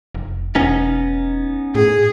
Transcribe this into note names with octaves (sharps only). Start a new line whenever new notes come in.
F1
E1 B3 C#4 D#4
A2 G#4